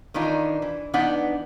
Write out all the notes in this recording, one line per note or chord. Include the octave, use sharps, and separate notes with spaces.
D#3 E3 D4 D#4 F4
E3
E3 B3 D4 D#4 B4 F#5